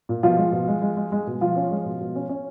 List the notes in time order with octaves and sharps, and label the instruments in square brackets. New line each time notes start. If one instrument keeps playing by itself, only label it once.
[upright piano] A#2
B2 F3 F4
G#3
B2
G#3
G#3
G#3
G#3
B2
B2 F3 F4
C#4
G#3
B2
B2
C#4
C#4